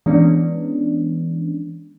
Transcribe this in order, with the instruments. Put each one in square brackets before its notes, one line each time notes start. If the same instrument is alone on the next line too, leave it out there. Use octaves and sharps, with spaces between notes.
[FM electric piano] E3 G#3 B3 C#4 D4